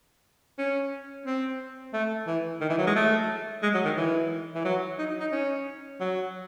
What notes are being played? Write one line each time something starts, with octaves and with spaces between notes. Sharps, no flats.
C#4
C4
A3
E3
D#3
E3
F#3
G#3
A3
G#3
F#3
D#3
E3
E3
F#3
D#4
D#4
C#4
F#3